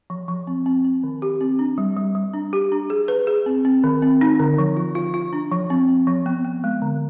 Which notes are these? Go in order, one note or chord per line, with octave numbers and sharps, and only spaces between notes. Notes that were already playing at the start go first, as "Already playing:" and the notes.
F3
F3
C4
C4
C4
D#3
G4
C4
D4
G3
G3
G3
D4
G4
D4
G#4
B4
G#4
C4
C4
D#3
C4
D#4
D3
F3
F4
F4
F4
D4
F3
C4
C4
F3
B3
B3
G#3
D3